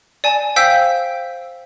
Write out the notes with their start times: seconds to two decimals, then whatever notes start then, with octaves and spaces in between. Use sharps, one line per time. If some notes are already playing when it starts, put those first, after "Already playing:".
0.24 D5 G#5 A5
0.56 C5 F5 G5 E6 G6 B6